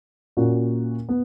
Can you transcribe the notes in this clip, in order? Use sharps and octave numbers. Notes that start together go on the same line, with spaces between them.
A#2 A#3 C#4 F#4
B3